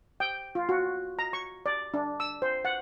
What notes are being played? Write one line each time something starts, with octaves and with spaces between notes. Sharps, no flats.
G5
F4
F#4
A#5
C#6
D5
D4
E6
C5
F#5